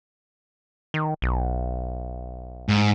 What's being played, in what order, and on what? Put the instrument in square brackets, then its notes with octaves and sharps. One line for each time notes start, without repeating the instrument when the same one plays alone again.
[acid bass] D#3
B1
[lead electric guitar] G#2